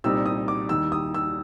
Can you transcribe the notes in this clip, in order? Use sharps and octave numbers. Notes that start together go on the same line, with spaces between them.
C2 A#2 G3 C4 D#4 E6
D#6
D6
D#2 D#3 G3 E6
D#6
E6